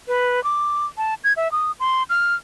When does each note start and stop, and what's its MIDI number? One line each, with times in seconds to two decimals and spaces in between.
0.08 0.43 71
0.44 0.86 86
0.98 1.14 81
1.24 1.33 92
1.37 1.51 76
1.52 1.72 87
1.80 2.03 84
2.10 2.35 89